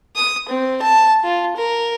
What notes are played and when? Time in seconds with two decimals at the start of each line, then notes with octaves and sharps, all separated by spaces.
0.16 D#6
0.49 C4
0.82 A5
1.24 F4
1.57 A#4